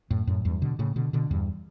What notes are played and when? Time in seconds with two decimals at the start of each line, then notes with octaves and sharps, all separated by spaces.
0.11 F#2 A2
0.27 F#2 A2
0.45 E2 G2
0.62 B2 D3
0.79 A2 C#3
0.96 B2 D3
1.13 B2 D3
1.31 E2 G2